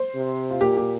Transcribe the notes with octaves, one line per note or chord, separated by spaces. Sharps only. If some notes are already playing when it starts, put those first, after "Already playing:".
Already playing: C5
C3
F4
A#2 G4
G4